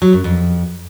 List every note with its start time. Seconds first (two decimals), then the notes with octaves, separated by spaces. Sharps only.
0.02 F#3
0.13 F#2
0.24 F2